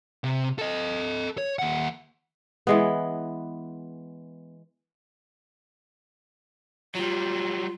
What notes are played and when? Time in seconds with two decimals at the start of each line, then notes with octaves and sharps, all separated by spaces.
0.24 C3
0.58 A4 D#5
1.38 C#5
1.59 D#2 F#5
2.67 E3 G#3 B3
6.95 F#3 G3 F4